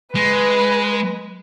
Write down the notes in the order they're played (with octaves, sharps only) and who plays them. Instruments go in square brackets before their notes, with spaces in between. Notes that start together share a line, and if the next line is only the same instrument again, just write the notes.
[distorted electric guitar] G#3 [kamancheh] B4